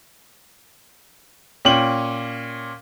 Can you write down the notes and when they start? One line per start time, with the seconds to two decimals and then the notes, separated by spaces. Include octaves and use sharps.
1.65 A#2 C#4 G5 F#7